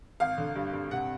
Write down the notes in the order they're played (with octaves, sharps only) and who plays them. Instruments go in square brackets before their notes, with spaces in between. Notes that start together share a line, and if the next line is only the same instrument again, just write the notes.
[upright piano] G#1 F5
D3
G2
G2
C3 F#5